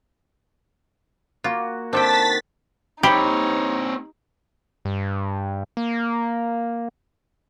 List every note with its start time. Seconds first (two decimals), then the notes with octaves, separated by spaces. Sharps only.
1.44 A#3 F4 F#4
1.93 D#3 C4 D4 A4 G5 A5 A6 B6
3.03 C4 D#4 G4 C#5 B5
4.85 G2
5.77 A#3